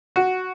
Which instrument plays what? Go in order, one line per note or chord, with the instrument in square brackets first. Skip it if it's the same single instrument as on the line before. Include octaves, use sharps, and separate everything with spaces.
[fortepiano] F#4